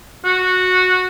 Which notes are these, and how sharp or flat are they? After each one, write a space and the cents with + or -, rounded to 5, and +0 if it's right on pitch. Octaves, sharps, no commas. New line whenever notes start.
F#4 -10